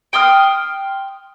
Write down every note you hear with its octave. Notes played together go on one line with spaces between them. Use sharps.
G5 C6 D#6 F6